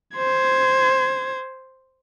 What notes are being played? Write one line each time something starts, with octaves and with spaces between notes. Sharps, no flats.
C5 G#6